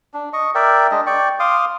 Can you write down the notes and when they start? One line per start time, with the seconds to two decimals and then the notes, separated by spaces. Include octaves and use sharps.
0.14 D4
0.33 D#5 C#6
0.55 A#4 D5 E5 G5
0.91 G#3 D4 D#5
1.06 D5 G5 C#6
1.40 F5 C6 D6 D#6